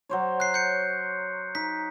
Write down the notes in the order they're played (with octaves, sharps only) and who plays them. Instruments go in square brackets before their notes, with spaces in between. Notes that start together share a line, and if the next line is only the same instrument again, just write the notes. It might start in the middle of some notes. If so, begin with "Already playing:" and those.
[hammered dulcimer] F#3 C5 C#5
[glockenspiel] F#6 C7
G6 C#7
[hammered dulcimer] D#4 [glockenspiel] B6